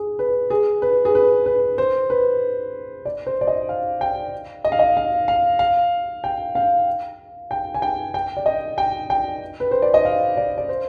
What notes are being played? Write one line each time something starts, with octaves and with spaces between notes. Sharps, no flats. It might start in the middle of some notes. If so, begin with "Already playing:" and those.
Already playing: G#4
B4
G#4
B4
G#4
B4
B4
C5
B4
D5
C5
D5
D#5
F5
G5
D#5
F5
D#5
F5
F5
F5
G5
F5
G5
G#5
G5
G5
D5
D#5
G5
G5
B4
C5
D5
D#5
F5
D5
D5
C5